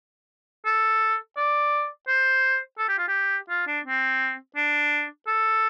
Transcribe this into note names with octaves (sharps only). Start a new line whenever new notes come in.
A4
D5
C5
A4
G4
F4
G4
F4
D4
C4
D4
A4